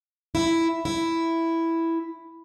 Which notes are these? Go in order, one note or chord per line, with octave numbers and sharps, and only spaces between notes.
E4
E4